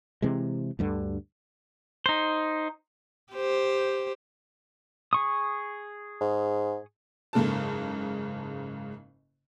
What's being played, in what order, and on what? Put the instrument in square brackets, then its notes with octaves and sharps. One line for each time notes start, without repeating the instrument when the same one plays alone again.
[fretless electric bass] C3 E3 G#3
D2 G2 D3
[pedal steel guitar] D#4 C5
[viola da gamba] G4 C5
[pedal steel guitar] G#4 C#6 D#6
[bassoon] G#2
[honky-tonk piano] F#1 G#2 C#3 A4 A5